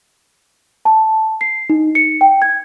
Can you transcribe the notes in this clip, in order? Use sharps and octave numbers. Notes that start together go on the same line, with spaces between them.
A5
C7
D#4
C#7
G5
G#6